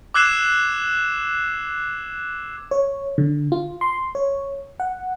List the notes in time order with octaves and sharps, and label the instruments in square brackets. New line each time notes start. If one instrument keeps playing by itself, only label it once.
[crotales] D6 E6 F#6 G#6 C7 E7
[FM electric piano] C#5
D3
F4
C6
C#5
F#5